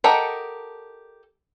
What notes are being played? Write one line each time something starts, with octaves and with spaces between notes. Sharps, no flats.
G4 A4 A#4 D#5 F#5